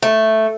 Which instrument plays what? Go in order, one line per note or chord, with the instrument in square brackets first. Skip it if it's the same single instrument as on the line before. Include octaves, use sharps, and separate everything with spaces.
[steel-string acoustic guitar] A3